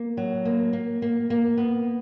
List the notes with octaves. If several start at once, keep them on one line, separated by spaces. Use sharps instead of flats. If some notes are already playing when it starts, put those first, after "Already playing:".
Already playing: A#3
F#3
A#3
A#3
A#3
A#3
B3